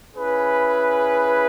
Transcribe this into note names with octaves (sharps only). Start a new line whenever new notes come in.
C#4 E4 G#4 B4